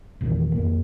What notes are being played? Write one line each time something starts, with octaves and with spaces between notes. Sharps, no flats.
A1 E2 A#2 D#3
F2 A#3